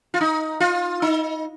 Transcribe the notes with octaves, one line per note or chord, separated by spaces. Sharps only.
F4
D#4
F4
D#4